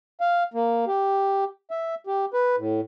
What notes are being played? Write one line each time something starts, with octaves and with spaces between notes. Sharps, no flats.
F5
A#3
G4
E5
G4
B4
A2